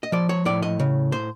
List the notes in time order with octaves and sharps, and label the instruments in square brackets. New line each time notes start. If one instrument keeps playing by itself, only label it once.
[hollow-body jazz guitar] D#5
F3 D5
C#5
A2 D5
D#5
C#3
C5